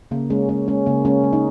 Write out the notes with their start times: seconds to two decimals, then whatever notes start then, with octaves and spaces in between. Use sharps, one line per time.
0.11 C#3 A#3
0.30 G#3 C#4
0.49 G#3 C#4
0.68 G#3 C#4
0.86 C#3 A#3
1.05 G#3 C#4
1.24 G#3
1.33 D#4